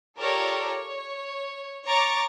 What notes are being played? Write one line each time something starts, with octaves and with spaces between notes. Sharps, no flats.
F4 G4 A4 A#4 C#5 D5
C#5
C#5 A#5 C#6 D6 A6